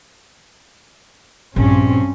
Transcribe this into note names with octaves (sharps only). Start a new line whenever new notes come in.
A#1 G2 C4 C#4